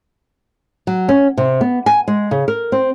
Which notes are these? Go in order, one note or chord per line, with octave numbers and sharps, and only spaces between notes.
F#3
C#4
C3
B3
G#5
G#3
C#3
A#4
C4